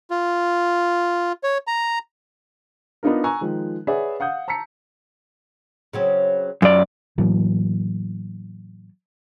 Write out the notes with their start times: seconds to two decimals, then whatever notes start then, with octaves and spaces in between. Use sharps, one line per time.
0.10 F4
1.43 C#5
1.67 A#5
3.03 B3 D4 D#4 F4 A#4
3.24 G#5 A#5 C#6 E6 F#6
3.41 D#3 F3 G#3
3.87 G#4 B4 C#5 D5 E5 F#5
4.20 F5 F#5 D#6 G6
4.48 A5 A#5 E6 B6 C#7
5.93 C#3 F#3 C4
6.62 F#2 F4 D5
7.18 A2 E3 F#3 A#3